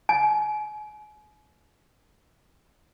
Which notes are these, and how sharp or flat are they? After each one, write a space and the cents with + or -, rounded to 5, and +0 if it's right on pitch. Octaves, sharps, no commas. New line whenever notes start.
G#5 +35